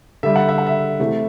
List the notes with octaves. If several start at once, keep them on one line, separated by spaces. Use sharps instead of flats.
D3 G3 E5
F#5
E5
F#5
E5
C3 E3 A3